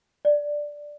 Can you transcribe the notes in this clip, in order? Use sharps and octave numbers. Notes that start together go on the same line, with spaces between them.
D5